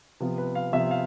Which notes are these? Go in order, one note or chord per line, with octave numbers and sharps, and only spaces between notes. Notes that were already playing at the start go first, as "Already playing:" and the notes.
C3 F3 B3
B4
F5
C3 F3 B3 E5
F5